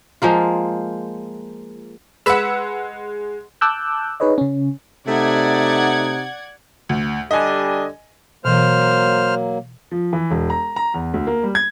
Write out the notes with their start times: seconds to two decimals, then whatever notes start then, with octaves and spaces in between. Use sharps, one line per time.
0.22 F3 G#3 A#3 F4
2.26 G#3 B4 F#5 B5 E6
3.61 A5 D6 E6 F#6 G6
4.20 D#4 G#4 B4 C#5 D#5
4.38 C#3 C#4
5.07 C3 A3 D#4 D5 F#5 G#6
6.89 D2
7.31 D3 G3 D#5 G#5
8.45 B2 E3 F#3 A#3 C5 F6
9.91 F3
10.13 E3
10.31 E1
10.50 A#5
10.76 A#5
10.94 E2
11.14 D2
11.27 A#3
11.43 G3
11.55 G#6